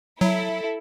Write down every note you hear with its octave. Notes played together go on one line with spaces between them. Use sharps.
F#3 E4 A4